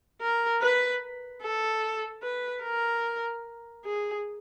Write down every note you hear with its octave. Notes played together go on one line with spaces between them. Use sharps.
A#4
B4
A4
B4
A#4
G#4